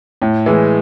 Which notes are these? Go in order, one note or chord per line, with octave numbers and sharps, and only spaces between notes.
A2
E3 G#3